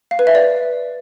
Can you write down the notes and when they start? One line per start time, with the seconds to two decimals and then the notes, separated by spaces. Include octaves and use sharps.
0.11 F5
0.19 B4
0.27 E5
0.35 D5